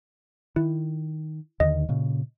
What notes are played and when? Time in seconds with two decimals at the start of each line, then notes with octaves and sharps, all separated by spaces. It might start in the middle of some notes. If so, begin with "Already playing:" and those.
0.56 D#3 E4
1.60 D#2 D3 D#3 D#5
1.89 A#2 C#3